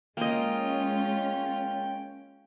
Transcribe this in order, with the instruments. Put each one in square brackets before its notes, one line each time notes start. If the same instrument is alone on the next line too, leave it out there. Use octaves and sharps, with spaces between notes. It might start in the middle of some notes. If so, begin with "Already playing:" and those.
[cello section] G#3 C#4 [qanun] A#3 D#5 [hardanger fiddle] F4 [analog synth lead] G5